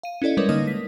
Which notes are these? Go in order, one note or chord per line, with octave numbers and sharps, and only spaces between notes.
F5 D#7
C#4 E4 A4 D5 D#5
G3 G#3 A#4 B4 C#5
D3 A#3 D#4 D#5 D#6
B6